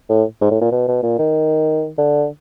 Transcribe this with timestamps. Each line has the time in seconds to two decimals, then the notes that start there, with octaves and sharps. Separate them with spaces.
0.10 A2
0.41 G#2
0.51 A2
0.61 A#2
0.72 B2
0.88 B2
1.03 A#2
1.19 D#3
1.98 D3